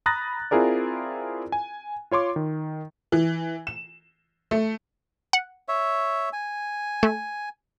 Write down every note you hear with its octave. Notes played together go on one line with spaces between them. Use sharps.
A#5 B5 D#6 F#6 A6 A#6
C4 E4 F4 G#4 A#4 D5
G#5
F4 C#5 C6 D6
D#3
E3
E7
A3
F#5
C#5 E5
G#5
A3